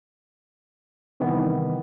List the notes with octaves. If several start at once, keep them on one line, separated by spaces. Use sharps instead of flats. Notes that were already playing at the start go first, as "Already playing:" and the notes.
C3 D#3 E3 G3 B3